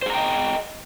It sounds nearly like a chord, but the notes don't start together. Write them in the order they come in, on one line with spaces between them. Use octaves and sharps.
C5 G#4 A#5 G5 D#5